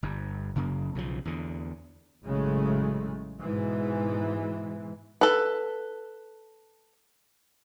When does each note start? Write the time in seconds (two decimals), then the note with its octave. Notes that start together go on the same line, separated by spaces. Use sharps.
0.03 G1 G2
0.55 F#1 F#2 C#3 A#3
0.95 B1 C#3 E3 F3
1.25 E2 D3
2.25 A1 C#3 F#3 G#3 A3
3.40 G#2 B2 E3 G#3
5.21 A4 B4